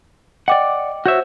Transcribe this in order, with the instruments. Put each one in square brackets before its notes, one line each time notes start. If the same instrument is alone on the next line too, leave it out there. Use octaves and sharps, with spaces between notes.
[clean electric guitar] D5 F#5 [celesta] D#5 G5 D6
[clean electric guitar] F#4 C#5 E5 [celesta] C5 G6